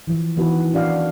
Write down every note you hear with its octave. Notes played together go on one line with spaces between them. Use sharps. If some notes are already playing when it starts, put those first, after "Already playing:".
E3 F3
D#3 E3 B3 F#4 B4
C#4 D4 F#4 D5 F5